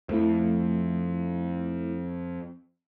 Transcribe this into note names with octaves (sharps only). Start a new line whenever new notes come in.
F2 F3 A3 E4